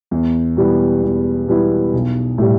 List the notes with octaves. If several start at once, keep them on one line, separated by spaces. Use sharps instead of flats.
E2
B2 G3 B3 E4
E2
B2 G3 B3 E4
B1
A2 G3